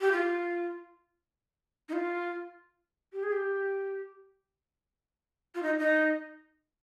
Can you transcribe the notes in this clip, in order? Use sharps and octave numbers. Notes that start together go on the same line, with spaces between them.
G4
F4
D#4
F4
G4
G#4
G4
F4
D#4
D#4